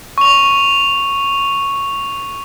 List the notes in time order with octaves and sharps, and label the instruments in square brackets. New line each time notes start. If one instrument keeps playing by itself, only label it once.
[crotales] C#6 F7